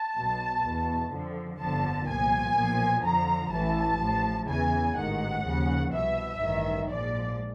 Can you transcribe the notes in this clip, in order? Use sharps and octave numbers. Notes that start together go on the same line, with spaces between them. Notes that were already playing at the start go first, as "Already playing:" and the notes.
Already playing: A5
B1 B2
E2 B2
F2 D3 F3
G1 F2 D3 F3 A5
C2 A#2 F3 G#5
B1 A#2 F3
F2 D3 F3 A#5
A1 A2 E3 A5
A1 A2 F3
E2 C#3 E3 G#5
A1 G#2 D#3 F#5
D#2 C#3 F3
C2 B2 E5
A1 G2 D#3
A#1 G#2 F3 D5